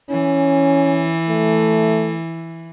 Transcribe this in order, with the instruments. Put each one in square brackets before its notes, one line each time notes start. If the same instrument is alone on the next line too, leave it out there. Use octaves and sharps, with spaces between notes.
[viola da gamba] E3 [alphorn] C#4
[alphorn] A3